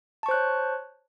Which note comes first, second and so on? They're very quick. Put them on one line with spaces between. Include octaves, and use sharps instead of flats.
A5 C#6 C5 F#6 C#5